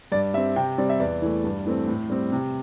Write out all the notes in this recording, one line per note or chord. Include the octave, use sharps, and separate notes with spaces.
G2 D5
G3 C4 E5
C3 G5
G3 C4 D5
E5
E2 D5
E3 A3
G2
E3 A3 C4
A2
G3 C4
C3